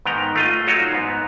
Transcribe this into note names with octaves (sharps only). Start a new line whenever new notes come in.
G#2 D#3 B3 G5 A#5
A3 F4 D#5
F#3 D#4 F4 F#4 C#5
G#2 B3